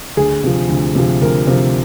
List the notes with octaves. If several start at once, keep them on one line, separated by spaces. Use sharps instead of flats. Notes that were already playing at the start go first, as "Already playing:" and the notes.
D2 G#4
C3 F3
D2
C3 F3
D2 A#4
C3 F3